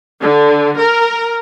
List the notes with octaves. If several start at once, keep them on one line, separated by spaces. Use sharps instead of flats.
D3
A#4